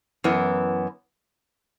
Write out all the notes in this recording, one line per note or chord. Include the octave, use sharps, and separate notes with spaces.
F#2 E3 B3